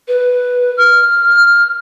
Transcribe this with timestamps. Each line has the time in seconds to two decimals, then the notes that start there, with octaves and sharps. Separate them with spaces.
0.08 B4
0.77 F6